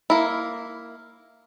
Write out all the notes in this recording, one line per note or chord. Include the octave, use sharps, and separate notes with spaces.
A#3 E4